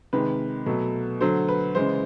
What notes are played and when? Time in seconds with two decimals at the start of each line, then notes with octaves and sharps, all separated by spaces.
0.13 C3 D#3 G#3 B4
0.66 B2 F#3 A3
1.21 D3 F#3 A3 C5
1.49 B4
1.75 C#3 E3 G#3 C5